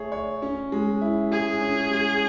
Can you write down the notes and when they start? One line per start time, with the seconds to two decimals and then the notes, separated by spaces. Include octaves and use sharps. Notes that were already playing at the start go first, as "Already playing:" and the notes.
Already playing: A3 G#4 C#5
0.12 C#5
0.42 C#4
0.72 G#3
1.01 E4
1.31 G#3 G#4
1.61 C#4
1.90 G#3